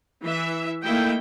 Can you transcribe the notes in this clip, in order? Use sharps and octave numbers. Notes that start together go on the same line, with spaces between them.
E3 E5
A3 A#3 D#4 E4 G5